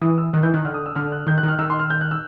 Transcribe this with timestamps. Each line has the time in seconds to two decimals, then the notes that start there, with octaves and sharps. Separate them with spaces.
0.01 E3 D#6
0.18 E6
0.33 D#3 F#6
0.43 E3 G6
0.54 D#3 F#6
0.64 D3 F6
0.74 D#6
0.86 E6
0.95 D3 F6
1.12 F#6
1.27 D#3 G6
1.38 F#6
1.43 D#3
1.48 F6
1.59 D#3 E6
1.70 C6
1.79 F6
1.90 G6
2.01 F#6
2.11 E6